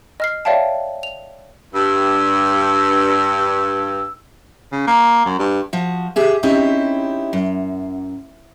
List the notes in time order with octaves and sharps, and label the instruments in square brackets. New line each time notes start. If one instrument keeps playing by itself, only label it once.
[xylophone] D#5 F6 C7
C#5 D5 E5 F5 G5 A5
F7
[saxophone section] G2 [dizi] E6
[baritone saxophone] C#3
A#3
F#2
G2
[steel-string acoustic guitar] F3 F#4
G4 G#4 E5
C4 C#4 D#4 E4 G4
F#2